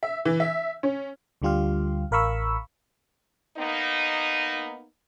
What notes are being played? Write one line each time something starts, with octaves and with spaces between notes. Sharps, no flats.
E5
E3
E5
C#4
D2 D3 G3 F4 G4 F5
A1 A#4 F5 B5 C#6 E6
A#3 B3 D#4